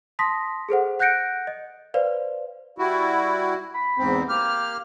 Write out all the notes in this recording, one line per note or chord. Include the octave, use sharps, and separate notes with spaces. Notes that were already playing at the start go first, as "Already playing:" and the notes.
A5 C6 D#6 A#6 B6
G#4 A4 C5 F#5
F#5 F#6 G6 A#6 C#7 D7
D#5
B4 C5 D5 F5
G3 E4 F#4
B5
E2 G#2 C4
A#3 G4 F6